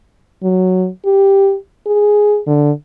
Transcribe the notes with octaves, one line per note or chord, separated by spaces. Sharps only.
F#3
G4
G#4
D3